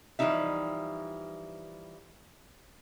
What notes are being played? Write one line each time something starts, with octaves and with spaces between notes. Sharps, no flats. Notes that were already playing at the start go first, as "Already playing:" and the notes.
E3 F3 G3 D#4 E5